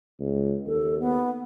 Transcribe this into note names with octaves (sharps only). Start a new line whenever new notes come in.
C#2
D#2 A4
B3